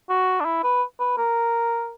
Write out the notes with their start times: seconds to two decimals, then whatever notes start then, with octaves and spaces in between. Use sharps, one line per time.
0.09 F#4
0.40 D4
0.45 E4
0.64 B4
1.00 B4
1.18 A#4